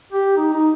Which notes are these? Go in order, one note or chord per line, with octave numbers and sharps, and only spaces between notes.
G4
D#4
D#4